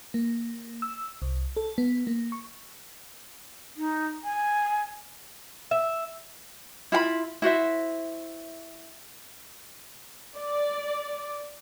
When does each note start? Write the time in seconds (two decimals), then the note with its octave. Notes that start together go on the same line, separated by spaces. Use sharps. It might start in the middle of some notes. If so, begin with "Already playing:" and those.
0.14 A#3
0.82 E6
1.22 C2
1.56 A4
1.78 B3
2.07 A#3
2.32 C#6
3.77 D#4
4.24 G#5
5.71 E5
6.92 E4 F4 F#5 B5
7.42 E4 F#4 C5 E5
10.36 D5